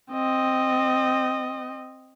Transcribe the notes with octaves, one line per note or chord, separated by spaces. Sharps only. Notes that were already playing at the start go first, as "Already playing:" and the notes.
C4 D#5